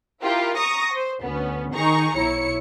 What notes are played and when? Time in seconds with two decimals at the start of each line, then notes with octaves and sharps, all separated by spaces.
0.22 E4 F4 G4 A#4
0.57 A#5 C#6 D#6 A#6
0.93 C5
1.22 D2 B3 C#4
1.73 D#3 D#4 G#4 A#5 C#6
2.16 B1 E4 C#5 C#7